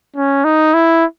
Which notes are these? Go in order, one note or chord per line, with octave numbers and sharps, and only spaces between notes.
C#4
D#4
E4